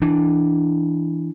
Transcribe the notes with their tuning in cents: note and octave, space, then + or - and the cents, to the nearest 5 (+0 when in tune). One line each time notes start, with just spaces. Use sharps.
E3 +0 D4 +0